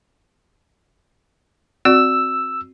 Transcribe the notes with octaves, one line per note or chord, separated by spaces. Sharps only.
C4 F#4 D5 E6